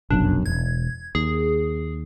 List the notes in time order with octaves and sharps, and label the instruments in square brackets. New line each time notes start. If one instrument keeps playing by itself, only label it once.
[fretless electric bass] F1 B1 F#2 [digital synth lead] D4
[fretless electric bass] E1 [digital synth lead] G#6
[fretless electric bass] D#2 [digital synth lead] G#4